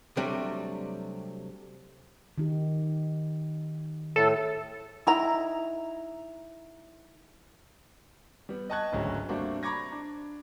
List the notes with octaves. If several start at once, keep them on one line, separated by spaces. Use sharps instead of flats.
C3 F#3 G3 A3 D4
D#3 D#4 G4
A2 A4
D#4 E4 A#5
G3 B3
D#5 G5 A5 C#6 F#6 G#6
G#1 D2 C#3 F#3
G3 A3 A#3 C4 D4 F#4
A#5 B5 C#6 D6 G#6 A#6
D4